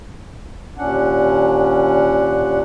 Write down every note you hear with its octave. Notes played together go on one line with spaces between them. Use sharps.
D#2 A#2 C#4 D4 F#5